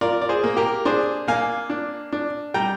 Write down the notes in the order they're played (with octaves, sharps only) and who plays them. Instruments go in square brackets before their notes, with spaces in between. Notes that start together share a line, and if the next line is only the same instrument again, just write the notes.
[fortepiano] F4 A#4 D5
D5
G#4 C5
A#3
G4 A#4
D4 G#4 C5
A#3 F5 G#5
D4
D4
G3 G5 A#5